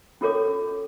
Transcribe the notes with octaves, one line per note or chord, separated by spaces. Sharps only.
C#4 F4 A4 A#4 C#5 D6